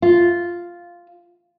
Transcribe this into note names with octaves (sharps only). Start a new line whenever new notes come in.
F4